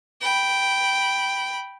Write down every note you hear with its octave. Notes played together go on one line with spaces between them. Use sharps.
G5 B5